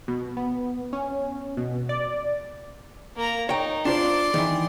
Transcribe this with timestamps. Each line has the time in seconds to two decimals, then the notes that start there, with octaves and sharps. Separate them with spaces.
0.08 B2
0.37 B3
0.93 C#4
1.57 B2
1.89 D5
3.16 A#3 A#5
3.49 D#4 C#5 G5
3.85 D4 F4 C5 D5 C6
4.34 D#3 E3